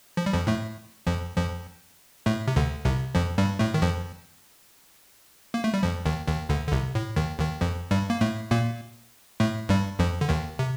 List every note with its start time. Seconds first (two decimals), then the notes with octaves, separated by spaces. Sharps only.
0.17 F3
0.26 G3
0.33 F2 F3
0.47 A2 A3
1.07 F2 F3
1.37 F2 F3
2.26 A2 A3
2.48 C3
2.56 D2 D3
2.85 C2 C3
3.15 F2 F3
3.38 G2 G3
3.59 A2 A3
3.74 D#3
3.82 F2 F3
5.54 A#3
5.64 A3
5.74 G3
5.83 F2 F3
6.05 D#2 D#3
6.27 D#2 D#3
6.49 D2 D3
6.68 D3
6.72 C2 C3
6.95 A2
7.16 D#2 D#3
7.39 D#2 D#3
7.61 F2 F3
7.91 G2 G3
8.10 A#3
8.21 A2 A3
8.51 A#2 A#3
9.40 A2 A3
9.69 G2 G3
9.99 F2 F3
10.21 D3
10.29 D#2 D#3
10.59 C3